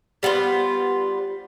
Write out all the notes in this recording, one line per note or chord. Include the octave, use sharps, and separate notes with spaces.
G3 B3 F4 C5